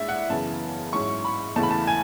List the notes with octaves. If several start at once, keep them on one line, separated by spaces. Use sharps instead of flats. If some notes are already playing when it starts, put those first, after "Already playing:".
Already playing: A2 G#3 D4 E5
F#5
F#2 C#3 E3 B3 A5
G#2 F#3 C#4 E4 C#6
B5
E2 C#3 E3 A3 E4 A5
B5
A5
G#5